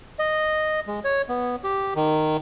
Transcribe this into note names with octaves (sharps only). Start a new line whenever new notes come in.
D#5
G#3
C#5
B3
G4
D#3